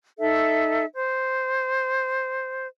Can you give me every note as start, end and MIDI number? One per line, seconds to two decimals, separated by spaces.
0.19 0.85 63
0.19 0.85 69
0.19 0.85 76
0.94 2.67 72